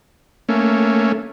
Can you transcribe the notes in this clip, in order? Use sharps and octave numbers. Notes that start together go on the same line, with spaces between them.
A3 A#3 C#4